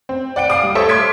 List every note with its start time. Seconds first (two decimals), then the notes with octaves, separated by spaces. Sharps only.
0.09 C4
0.36 D5 F#5 G5 D7
0.50 F5 G#5 D6 D#6
0.63 G3
0.75 A4 C5 C#5 E5
0.89 C6 D6 F6 G#6 B6 D7